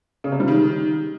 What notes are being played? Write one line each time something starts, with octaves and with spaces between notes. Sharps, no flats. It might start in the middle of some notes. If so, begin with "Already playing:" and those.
C#3
C3
G3
D#3